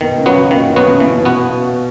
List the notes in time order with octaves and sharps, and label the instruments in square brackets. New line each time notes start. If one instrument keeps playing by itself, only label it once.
[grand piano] B2 [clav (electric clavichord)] D#3
[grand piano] C#3
[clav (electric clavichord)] F#3 B3 F#4
[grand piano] C#3
[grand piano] A#2 [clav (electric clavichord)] D#3
[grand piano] B2
[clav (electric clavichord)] F#3 B3 F#4
[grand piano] C#3
[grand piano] B2 [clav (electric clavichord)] E3
[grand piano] B2
[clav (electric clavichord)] B3 F#4